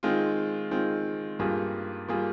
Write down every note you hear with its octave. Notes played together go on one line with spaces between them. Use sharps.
D#3 G#3 C4 F4
D#3 G#3 C4 F4
G2 G3 A#3 F4 G#4
G3 A#3 F4 G#4